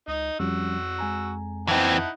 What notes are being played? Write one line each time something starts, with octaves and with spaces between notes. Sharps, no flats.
C#2 D#4 D#5
F2 F3 G3 C#4 F#4 E6
G#3 G#5 A#5
E3 C4 D#4 E4 E5 F#5 A5